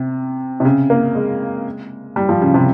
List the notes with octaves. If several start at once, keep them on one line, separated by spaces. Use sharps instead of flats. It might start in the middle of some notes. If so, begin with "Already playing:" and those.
Already playing: C3
C3
C#3
A#3
G#3
G3
F3
C#3
C3